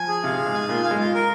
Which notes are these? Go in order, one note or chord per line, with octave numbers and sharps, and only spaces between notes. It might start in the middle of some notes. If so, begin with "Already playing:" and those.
Already playing: F3 G#5
G#4
C3 F5
G#4
G#2
G#5
A#2 F4
F5
G#3
F4
A#4